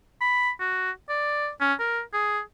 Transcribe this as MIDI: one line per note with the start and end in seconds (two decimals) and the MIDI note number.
0.21 0.50 83
0.60 0.91 66
1.09 1.49 74
1.61 1.73 61
1.79 2.01 70
2.13 2.40 68